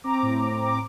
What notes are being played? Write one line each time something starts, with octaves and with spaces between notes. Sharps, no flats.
C4 A#5 D6
A2
A2
C4
D6